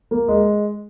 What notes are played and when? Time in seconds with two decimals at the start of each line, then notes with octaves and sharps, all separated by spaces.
0.11 A#3
0.28 G#3